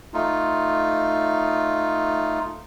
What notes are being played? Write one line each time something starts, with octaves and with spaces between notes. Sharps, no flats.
A3 D#4 F4